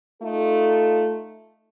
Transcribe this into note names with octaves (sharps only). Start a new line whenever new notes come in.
A3 D#4 F4 A4